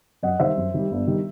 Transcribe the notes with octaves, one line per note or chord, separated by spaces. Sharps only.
F#2 D#5 F#5
D#3 G3 C5 E5
F#2
D#3 G3
G1
D#3 G3